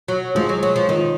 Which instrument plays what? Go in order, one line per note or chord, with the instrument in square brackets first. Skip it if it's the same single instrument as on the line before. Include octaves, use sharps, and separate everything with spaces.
[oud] F#3
[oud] F3 [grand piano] G#3
[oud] F#3
F#3
F3
[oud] D#3 [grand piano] F3